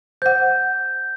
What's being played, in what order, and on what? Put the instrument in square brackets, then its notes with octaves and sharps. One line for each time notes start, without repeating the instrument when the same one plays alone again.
[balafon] C5 F#5 [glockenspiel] G6